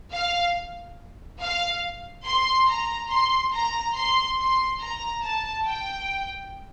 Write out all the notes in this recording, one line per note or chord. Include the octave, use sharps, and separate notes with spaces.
F5
F5
C6
A#5
C6
A#5
C6
C6
A#5
A5
G5